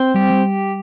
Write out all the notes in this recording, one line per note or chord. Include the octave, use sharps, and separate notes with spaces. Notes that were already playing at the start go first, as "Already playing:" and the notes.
Already playing: C4
G3 G4
G3